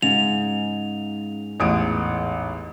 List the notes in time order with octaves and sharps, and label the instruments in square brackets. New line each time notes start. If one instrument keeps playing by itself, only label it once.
[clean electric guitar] G#2 [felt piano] C#3 [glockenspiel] F7
[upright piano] A1 [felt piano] E2 D#6 D7